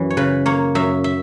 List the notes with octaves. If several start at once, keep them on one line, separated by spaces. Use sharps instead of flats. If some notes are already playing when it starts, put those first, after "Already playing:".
Already playing: F#2 E3
C#5
C#3 B4
A#3 C#5
F#2 E5
E5